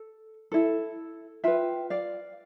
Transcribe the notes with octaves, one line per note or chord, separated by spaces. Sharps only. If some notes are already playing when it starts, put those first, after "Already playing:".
Already playing: A4
E4 A4
F4 B4 E5 G5
D5 F5